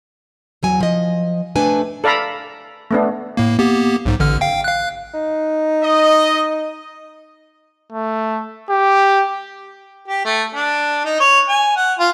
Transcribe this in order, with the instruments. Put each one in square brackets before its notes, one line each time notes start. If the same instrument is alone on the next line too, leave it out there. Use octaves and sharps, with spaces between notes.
[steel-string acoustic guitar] E2 F#3 G#5
F3 D#5
C3 A3 D4 A4 B4 G#5
[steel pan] A4 D5 F5 A#5 B5
A3 B3 D4
[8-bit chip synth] A2 A#3
A#3 B3 G4
B1 G#2
A1 D3 F6
F5 G5
F5 F#6
[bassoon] D#4
[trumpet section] D#5
[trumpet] A3
G4
[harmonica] G4
A3
D4
D#4
C#5
G#5
F#5
F4